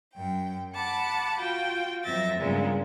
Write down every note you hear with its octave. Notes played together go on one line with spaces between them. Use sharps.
F#2 G5
F#5 A5 B5 D6
F4 F#4 G5
F2 F#3 C4 E5 A6 A#6
G2 A#2 C#3 G#3 B3